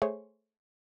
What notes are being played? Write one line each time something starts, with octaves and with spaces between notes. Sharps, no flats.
A3 G#4 C5 C#5